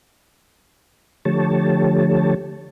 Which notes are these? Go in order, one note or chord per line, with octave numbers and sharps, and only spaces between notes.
D3 F3 A3 G4 C#5 A5